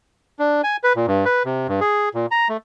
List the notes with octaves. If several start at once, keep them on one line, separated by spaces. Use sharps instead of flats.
D4
G#5
B4
A#2
G2
B4
C3
G2
G#4
A#2
A#5
A3